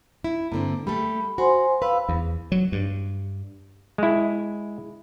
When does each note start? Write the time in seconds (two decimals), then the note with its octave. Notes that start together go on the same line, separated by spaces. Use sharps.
0.24 E4
0.52 G2 D3 A#3 C4
0.87 G3 A3 A4 B5
1.38 F#4 C5 G#5 C6
1.82 B4 F5 B5 E6
2.09 E2
2.52 F#3
2.72 G2
3.98 G#3 E4